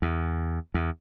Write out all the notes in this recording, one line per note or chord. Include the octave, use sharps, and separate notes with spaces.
E2
E2